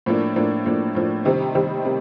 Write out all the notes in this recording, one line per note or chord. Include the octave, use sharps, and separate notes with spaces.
A2 F3 A#3 D4
A2 F3 A#3 D4
A2 F3 A#3 D4
A2 F3 A#3 D4
C3 D#3 G3 C4
C3 D#3 G3 C4
C3